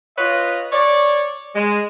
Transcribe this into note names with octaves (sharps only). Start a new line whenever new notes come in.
F4 B4 C#5 D#5
C#5 D5
G#3